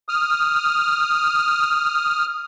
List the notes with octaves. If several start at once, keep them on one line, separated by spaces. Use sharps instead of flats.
D#6 F6